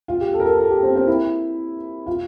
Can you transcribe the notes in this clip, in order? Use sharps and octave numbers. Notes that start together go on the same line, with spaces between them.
F4
G4
A4
A#4
A4
A4
G4
C4
C4
E4
F4